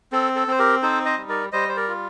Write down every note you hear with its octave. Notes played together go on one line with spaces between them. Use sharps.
C4 A4
A4
C4 C5
G4 A#4
D#4 A4 C5
C5 D#5
G3
A#4 D5
G3 C5 D#5
C5
A#4 D5
F4